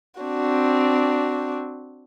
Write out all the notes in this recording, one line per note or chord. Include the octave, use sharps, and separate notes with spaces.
C4 D4 F#4